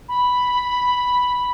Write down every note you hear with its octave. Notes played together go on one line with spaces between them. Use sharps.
B5